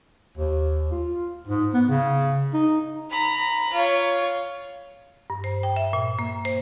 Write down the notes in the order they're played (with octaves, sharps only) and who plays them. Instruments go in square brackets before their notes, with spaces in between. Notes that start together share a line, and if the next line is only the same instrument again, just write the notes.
[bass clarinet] D#2
F4
G#2
B3
C#3
D#4
[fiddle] A#5 B5
F4 C#5
[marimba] G2
C5
G5
E5
A#2
A#3
C5